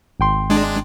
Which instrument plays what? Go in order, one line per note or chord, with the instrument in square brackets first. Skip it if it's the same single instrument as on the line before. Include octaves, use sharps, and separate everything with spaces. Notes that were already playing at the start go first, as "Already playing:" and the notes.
[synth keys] G#1 G5 C6
[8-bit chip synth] G#3 D4